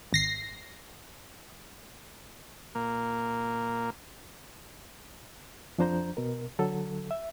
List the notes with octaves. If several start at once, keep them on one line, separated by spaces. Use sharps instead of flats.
G#1 A#6 C7
A#2 A#3
F2 F3 D4 C5 A#5 G6
B2 A#4
D3 F#3 A4
E5